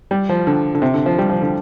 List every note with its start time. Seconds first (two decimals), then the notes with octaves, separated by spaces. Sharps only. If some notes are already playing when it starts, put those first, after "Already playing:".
0.11 G3
0.29 F3
0.47 D3
0.75 D3
0.82 C3
0.94 D3
1.06 F3
1.18 G3
1.29 F3
1.42 D3